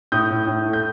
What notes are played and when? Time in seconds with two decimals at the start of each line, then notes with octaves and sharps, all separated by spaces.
0.12 A2 D#6 G6
0.31 A2
0.47 A2
0.66 A3
0.73 G6